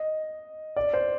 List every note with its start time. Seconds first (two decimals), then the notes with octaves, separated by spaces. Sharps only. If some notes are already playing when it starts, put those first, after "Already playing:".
Already playing: D#5
0.76 D5
0.94 C5